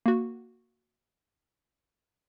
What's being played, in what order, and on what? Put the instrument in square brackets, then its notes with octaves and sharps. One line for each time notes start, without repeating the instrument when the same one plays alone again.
[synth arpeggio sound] A#3 F#4